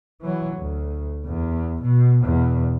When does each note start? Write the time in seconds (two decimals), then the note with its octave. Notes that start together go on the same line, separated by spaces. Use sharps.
0.21 E3 F#3
0.56 D2
1.26 E2
1.82 B2
2.24 E2 B2